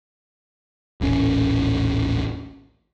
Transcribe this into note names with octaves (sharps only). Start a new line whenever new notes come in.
D#1 A1 C#4